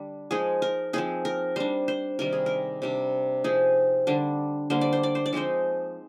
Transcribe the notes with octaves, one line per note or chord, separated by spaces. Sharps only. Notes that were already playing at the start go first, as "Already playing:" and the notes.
Already playing: D3 G3 D4
F3 G#3 D#4 G#4
A#4
F3 C4 D#4 G#4
A#4
G3 D4 C5
C5
C3 D#3 G3 A#4
G#4
A#4
C3 G3 D4
F3 C4 D#4 G#4
D3 G3 D4
D3 G3 A#3 C5
D5
C5
D5
C5
D5
F3 G#3 C4 D#4 C5